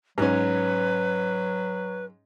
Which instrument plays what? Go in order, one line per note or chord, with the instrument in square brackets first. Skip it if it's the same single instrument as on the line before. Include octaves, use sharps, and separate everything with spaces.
[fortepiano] G#2 C#4 [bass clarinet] F#3 [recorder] B4